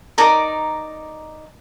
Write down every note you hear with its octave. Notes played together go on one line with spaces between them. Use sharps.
D#4 A#4 D5 A#5